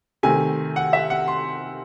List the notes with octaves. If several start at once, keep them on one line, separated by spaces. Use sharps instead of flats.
C3 D#3 A3 G#5
F#5
E5
F#5
C6